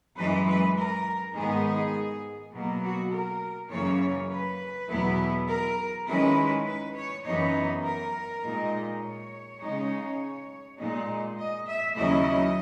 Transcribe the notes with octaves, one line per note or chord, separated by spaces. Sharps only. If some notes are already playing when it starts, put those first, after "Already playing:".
F#2 E3 G#3 B4
B4
A#4
G#2 D#3 G#3 B3 D#4 G#4
B2 F#3 A#3
F#4
A#4
F#2 C#3 E3 A#3 C#5
B4
E2 B2 F#3 B3 E4
A#4
D#3 G#3 C#4 E4 B4
B4
C#5
F#2 E3 B3 D#4 C#5
A#4
A#2 G#3 D#4
C#5
C#3 G#3 D#4
A#2 G#3 D#4
D#5
E5
D#2 C#3 F#3 C#4 E4 D#5